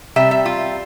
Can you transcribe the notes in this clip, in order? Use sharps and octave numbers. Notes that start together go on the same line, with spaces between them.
C3 G3 E5
E5
F4